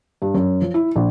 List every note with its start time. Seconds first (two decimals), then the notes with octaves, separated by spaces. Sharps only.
0.22 G2
0.34 F#2
0.62 F3
0.74 E4
0.96 A#1